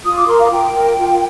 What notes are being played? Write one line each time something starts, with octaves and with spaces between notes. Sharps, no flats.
F4 D#6
D6
A#4 C6
F5
F4 G5
A#4
F4